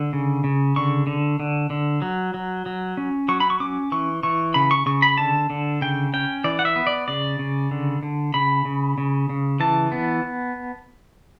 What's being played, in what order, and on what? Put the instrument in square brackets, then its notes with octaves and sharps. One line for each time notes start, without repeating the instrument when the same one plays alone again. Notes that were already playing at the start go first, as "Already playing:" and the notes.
Already playing: [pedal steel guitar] D3
C#3
C#3
D3 C#6
D3
D3
D3
F#3
F#3
F#3
C#4
F#3 C#6
B5
C#6
C#4 D6
E3 C#6
E3 C#6
C#3 B5
C#6
C#3 C#6
B5
D3 A5
D3
C#3 G5
C#4 G5
E3 D5
F#5
E5
B3
D5
C#3 D5
C#3
D3
D3
C#3 B5
C#3
C#3
C#3
E3 A5
B3